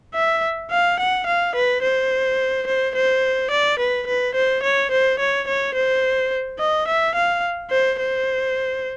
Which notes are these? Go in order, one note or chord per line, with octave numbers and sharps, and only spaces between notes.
E5
F5
F#5
F5
B4
C5
C5
C5
D5
B4
B4
C5
C#5
C5
C#5
C#5
C5
D#5
E5
F5
C5
C5